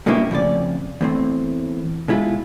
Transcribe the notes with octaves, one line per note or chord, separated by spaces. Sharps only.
G2 B2 A#3 C#4 E4 G4
F2 A2 C#3 D5
E2 A2 C4
B2 G#3 E4 F4